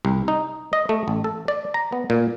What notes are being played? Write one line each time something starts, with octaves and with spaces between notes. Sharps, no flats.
C2
D#4
D#5
A3
A1
A4
D5
A#5
B3
A#2